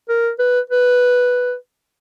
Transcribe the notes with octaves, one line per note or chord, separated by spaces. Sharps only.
A#4
B4
B4